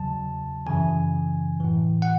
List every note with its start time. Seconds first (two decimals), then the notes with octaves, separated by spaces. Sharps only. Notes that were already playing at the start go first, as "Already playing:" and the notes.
Already playing: E2 C#3 F#3 A5
0.66 F#2 C#3 E3 G#5
1.60 A2 E3
2.02 F#5